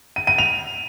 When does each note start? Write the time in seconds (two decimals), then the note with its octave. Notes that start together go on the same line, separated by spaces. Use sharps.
0.16 D#7
0.27 D#7
0.38 F7